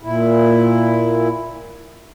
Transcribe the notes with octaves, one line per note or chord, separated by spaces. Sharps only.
A#2 E4